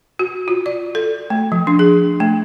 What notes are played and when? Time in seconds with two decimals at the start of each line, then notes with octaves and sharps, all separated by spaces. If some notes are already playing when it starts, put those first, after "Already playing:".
0.19 F#4
0.48 F4
0.66 D5
0.95 A4
1.30 A3
1.52 F3
1.67 D4
1.79 G#4
2.20 A3